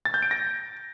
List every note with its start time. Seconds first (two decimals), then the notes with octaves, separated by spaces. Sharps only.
0.05 A6
0.14 G6
0.22 D7
0.31 A#6